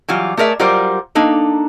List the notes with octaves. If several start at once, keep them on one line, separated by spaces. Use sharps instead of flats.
E3 F#3 G3 F4
A3 G#4 A#4 D5 E5
F#3 G3 F4 A#4 C5 D5
A#3 D4 D#4 A4